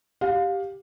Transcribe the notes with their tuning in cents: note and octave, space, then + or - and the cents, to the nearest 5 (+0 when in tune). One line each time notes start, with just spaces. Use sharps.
G4 +0 F5 +20